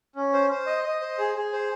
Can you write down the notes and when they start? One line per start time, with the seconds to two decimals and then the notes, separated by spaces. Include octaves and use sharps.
0.16 C#4
0.33 C5
0.50 C5
0.67 D#5
0.84 D#5
1.01 C5
1.18 G#4
1.35 G#4
1.53 C5